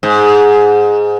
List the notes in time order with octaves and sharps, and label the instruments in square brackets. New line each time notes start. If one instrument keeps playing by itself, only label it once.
[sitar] G#2